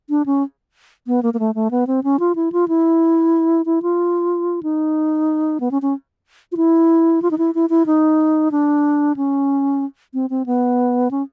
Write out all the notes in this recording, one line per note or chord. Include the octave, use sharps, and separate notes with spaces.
D4
C#4
B3
A#3
A#3
A3
A3
B3
C4
C#4
F4
E4
F4
E4
E4
F4
D#4
B3
C#4
C#4
F4
E4
F4
D#4
E4
E4
E4
D#4
D4
C#4
C4
C4
B3
C#4